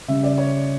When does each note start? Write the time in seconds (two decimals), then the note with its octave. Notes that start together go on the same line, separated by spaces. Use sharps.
0.08 C#3 G3 C#4 E5
0.23 D5
0.38 C#5